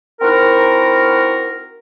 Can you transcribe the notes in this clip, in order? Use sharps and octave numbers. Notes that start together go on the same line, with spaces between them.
C4 D#4 E4 F#4 A#4